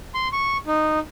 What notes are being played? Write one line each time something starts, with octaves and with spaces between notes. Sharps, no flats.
C6
C#6
D#4